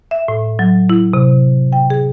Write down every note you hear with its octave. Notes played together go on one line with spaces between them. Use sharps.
E5
A2
F#3
E4
C3
G5
G#4